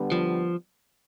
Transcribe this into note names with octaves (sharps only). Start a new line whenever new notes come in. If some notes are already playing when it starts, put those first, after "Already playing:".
Already playing: D3 G3 B3
F3